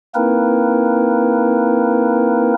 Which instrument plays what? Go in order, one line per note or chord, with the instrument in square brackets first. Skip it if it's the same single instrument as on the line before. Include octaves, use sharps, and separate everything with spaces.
[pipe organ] A#3 C4 D#4 E4 A#4 B4